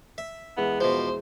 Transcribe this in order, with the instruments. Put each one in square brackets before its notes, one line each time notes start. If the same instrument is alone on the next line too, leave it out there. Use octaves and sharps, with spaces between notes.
[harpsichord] E5
[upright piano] E2 G#3 E4 [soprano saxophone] B3
[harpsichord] B2 F3 [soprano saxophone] C5